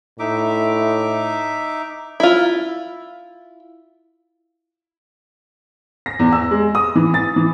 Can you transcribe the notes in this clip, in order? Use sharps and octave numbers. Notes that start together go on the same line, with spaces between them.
A2 D#4 E5 D6
E4 F4
A#6
E2
E6
G#3
D#6
E3
A6
E3